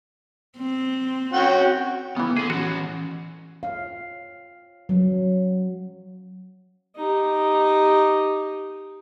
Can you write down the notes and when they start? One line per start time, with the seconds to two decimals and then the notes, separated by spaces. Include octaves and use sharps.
0.58 C4
1.33 C#4 F#4 G5
2.17 C#3 E3 B3
2.37 G#4 A4 F#5
2.50 E3 C#4 F#4
3.63 F5
4.89 F#3
6.96 D#4 G4